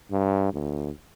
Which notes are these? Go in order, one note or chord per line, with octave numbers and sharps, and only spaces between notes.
G2
D2